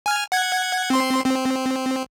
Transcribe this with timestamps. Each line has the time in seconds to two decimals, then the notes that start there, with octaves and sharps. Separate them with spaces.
0.06 G#5 F6
0.32 F#5 G#6
0.90 C4 C6
1.25 C4